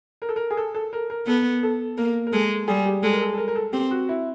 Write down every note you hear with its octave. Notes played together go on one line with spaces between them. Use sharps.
A#4
A4
A#4
G#4
A4
A4
A#4
A#4
B3 A4
A4
A#3 A#4
A#4
G#3 A4
G3 G#4
G4
G#3 A4
A#4
A4
A4
A#4
A#4
A4
C4 G4
F#4
E4